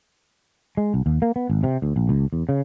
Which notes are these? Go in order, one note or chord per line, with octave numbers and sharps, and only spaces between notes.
G#3
C2
D#2
A#3
B3
G#1
C3
D2
A#1
C#2
E2
C#3